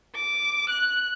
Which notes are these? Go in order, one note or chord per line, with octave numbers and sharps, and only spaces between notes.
D6
F#6